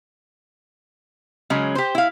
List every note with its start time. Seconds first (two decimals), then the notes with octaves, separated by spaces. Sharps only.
1.50 C#3 F#3 G#3 C#4
1.75 G4 C5
1.95 E4 F5